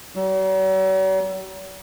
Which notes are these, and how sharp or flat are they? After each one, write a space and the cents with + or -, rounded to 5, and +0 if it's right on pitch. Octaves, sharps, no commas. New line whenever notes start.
F#3 +45